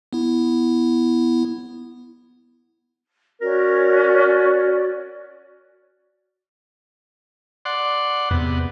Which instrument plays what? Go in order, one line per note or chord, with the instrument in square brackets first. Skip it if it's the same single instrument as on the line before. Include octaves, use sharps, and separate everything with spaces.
[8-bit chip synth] B3 E4
[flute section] C#4 F#4 D5 [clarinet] A#4
[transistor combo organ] D5 F#5 C6
[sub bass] E2 [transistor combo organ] C3 B3